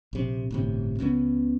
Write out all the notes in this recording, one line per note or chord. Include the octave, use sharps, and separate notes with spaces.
A#1 C3
G1 A2 C3
C#2 C#3 E3 B3